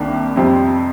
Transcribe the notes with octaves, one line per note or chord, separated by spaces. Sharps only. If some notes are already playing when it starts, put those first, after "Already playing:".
Already playing: C2 C3 D#3 A#3 D4
F2 C3 G3 C4